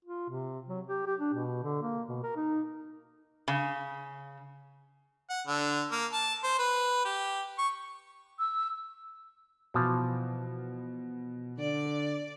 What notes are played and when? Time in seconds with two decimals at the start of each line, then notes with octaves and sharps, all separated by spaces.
0.05 F4
0.30 C3
0.69 F#3
0.87 G4
1.06 G4
1.20 D4
1.33 B2
1.63 D3
1.82 A#3
2.08 B2
2.23 A#4
2.36 D#4
3.48 C#3
5.30 F#5
5.47 D3
5.92 A#3
6.13 A5
6.44 C5
6.59 B4
7.05 G4
7.58 C#6
8.39 E6
9.74 B2 E3 F3
11.58 D3 D5